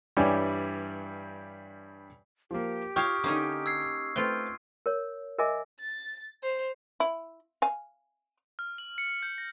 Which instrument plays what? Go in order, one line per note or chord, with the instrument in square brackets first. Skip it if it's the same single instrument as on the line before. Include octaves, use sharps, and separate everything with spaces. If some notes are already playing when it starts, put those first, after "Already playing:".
[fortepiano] G2 E3 G3 C#5 D5 G#5
[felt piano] F3 A#3 [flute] G4
[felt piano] F4 G5 G6 [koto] C#5 F5 [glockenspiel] C#6 D#6 F6
[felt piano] D3 [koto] A#3 C#4 D#4
[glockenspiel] E6 G#6 C7
[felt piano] A3 C4 B4 [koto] F4 G5
[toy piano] A#4 C#5
A#4 D#5 E5 G#5 D6
[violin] A6
C5 F7
[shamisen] E4
F5 G#5
[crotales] F6
F#7
C#7
G6
A#6